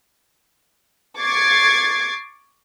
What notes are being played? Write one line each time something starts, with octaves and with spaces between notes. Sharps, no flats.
C#6 D6 G#6 A6 C7